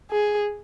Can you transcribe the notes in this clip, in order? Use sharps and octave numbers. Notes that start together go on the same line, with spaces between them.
G#4